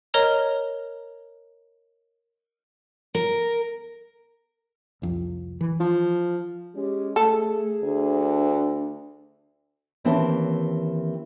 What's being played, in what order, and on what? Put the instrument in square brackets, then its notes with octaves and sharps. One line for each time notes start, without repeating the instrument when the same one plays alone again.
[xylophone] A#4 C#5 D#5 A#5 F6
[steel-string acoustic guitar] A#4
[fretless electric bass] C2 F2 C3
E3
[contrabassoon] F3
[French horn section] G#3 C#4 [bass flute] G4
[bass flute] A3 [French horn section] G#4 [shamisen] A4
[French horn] D2 [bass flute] D4
[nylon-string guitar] D#2 E3 C4 C#4 A5